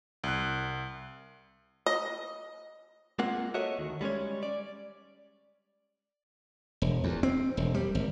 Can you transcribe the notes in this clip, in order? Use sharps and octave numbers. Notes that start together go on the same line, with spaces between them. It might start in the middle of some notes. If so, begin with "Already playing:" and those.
C2 F#6
D#5
G#3 A#3 C4 F4 A#4 F#5
F#4 A4 A#4 C#5 D#5 E5
D2 D#3
G3 G#3 C#4 C#5
D5
E1
E2
C4
E1
G3
G#1